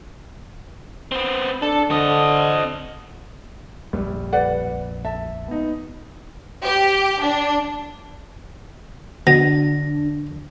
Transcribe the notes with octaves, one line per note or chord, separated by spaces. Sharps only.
B3 C4
D4 A4
D3 C4 D#5
A#1 F2 G3
B4 D5 F#5
E5 A5
B3 D#4
G4
D4
B2 D3 D4 A#6